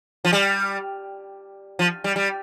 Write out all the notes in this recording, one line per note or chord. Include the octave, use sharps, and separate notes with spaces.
F3
G3
F3
G3
G3